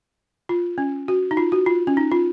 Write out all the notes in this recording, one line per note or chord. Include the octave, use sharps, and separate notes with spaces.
F4
C#4
F#4
D#4
F4
F#4
F4
C#4
D#4
F4